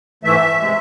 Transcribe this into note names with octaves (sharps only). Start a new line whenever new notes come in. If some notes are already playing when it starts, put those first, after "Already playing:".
G#2 E3 A3 E5
C3 G#3